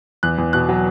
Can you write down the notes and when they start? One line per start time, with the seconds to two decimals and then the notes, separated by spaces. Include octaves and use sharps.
0.23 E2 F#6
0.38 E2
0.53 B2 F#6
0.69 F#3